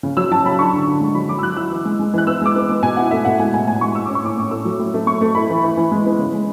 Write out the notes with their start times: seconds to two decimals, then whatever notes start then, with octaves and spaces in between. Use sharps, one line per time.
0.03 C#3
0.17 F#3 E6
0.31 F#3 A5
0.46 C#3 B5
0.59 D4 C#6
0.74 D3
0.87 D3
1.01 G#3
1.15 F#3 B5
1.29 F#3 D6
1.39 E6
1.43 F#3 F#6
1.57 E4 E6
1.71 E3
1.85 G#3
1.99 G#3
2.14 E3 F#6
2.27 B3 E6
2.42 G#3 D6
2.56 B3
2.69 G#3
2.83 B2 G#5
2.97 E4 F#5
3.11 A3 E5
3.25 B2 F#5
3.39 G#3 G#5
3.53 A2 G#5
3.67 A2 G#5
3.81 G#3 C#6
3.95 A2 E6
4.06 C#4 D6
4.15 C#6
4.23 A2 D6
4.38 A2
4.51 A3 E6
4.65 F#3
4.79 A2
4.94 A3
5.07 A3 C#6
5.21 A3
5.35 E4 B5
5.50 E3
5.63 E3
5.77 E3
5.92 G#3
6.06 B3
6.19 C#3
6.33 G#3